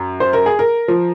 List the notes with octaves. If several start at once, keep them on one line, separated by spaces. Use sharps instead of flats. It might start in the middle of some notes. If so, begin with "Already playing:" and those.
Already playing: F#2
C5
A#4
G#4
A#4
F3